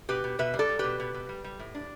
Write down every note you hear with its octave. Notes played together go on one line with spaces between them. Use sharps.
B2 G4 B4
B2
B2 B4 E5
G3
A4 D5
G3
B2 G4 B4
B2
B2
G3
G3
A2
D4